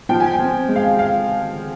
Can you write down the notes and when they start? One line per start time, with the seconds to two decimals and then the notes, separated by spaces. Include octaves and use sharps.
0.09 F3 G5
0.20 G#5
0.31 G5
0.39 C4
0.68 G#3
0.76 F5
0.99 F5